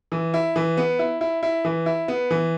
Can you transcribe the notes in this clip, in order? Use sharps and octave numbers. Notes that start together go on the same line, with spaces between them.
E3
E4
E3
B3
E4
E4
E4
E3
E4
B3
E3